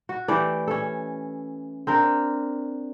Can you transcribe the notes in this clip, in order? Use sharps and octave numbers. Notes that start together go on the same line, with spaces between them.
F#4
E3 A3 G4 D5
C#4 A4
C4 D4 A#4